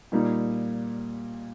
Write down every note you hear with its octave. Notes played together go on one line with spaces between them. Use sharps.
A#2 G3 A#3 D#4